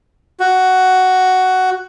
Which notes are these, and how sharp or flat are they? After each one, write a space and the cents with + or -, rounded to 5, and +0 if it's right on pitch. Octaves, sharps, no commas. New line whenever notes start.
F#4 +10